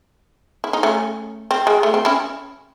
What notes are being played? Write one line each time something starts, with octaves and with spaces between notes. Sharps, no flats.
E4
D#4
A3 C#4
C4
G#3
A3
C4
C#4 E4